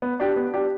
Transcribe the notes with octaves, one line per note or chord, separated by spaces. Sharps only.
B3
D4 G4
B3
D4 G4